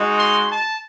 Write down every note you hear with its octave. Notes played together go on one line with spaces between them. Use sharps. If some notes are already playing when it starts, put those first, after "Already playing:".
Already playing: G#3 D#4 F#4
C6
A5